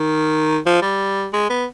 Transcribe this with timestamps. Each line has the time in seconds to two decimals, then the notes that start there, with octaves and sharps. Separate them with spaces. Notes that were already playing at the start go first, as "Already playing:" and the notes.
Already playing: D#3
0.66 F3
0.82 G3
1.33 G#3
1.50 B3